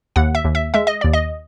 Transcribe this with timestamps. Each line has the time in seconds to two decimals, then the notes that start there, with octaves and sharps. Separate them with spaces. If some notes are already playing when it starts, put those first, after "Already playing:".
0.16 D#2 F#5
0.35 E5
0.44 D#2
0.55 E5
0.74 G#3 E5
0.87 D#5
1.01 D#2 D5
1.13 D#5